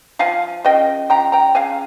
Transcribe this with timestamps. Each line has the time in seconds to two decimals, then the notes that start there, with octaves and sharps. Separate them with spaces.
0.19 F3 F5 G#5
0.65 C#3 D#5 G5
1.10 F3 G5 A#5
1.32 G5 A#5
1.55 C#3 F5 G#5